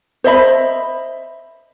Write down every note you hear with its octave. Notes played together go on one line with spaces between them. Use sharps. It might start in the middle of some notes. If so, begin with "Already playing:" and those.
C5 D#5 E5 B5